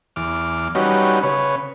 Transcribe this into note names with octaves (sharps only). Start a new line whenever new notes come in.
E2 D6 F6
G3 C#4 D#4 F#4 B4
C#3 B4 C#5